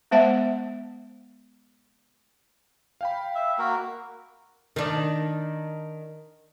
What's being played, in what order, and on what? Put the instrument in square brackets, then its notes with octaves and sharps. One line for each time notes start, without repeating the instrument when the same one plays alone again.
[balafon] G#3 B3 C5 E5 F#5 A5
[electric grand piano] F5 G5 B5
[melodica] E5
A#3 F#4 A#4
[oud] D#3 D4